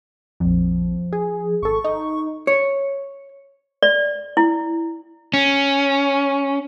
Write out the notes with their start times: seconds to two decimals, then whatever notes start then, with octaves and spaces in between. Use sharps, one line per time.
0.40 A#1 F2 F3
1.13 G#4
1.62 G#1 A4 C#6
1.84 D#4
2.47 C#5
3.83 D5
4.37 E4
5.34 C#4